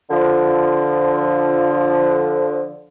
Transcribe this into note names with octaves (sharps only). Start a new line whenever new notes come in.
D3 F3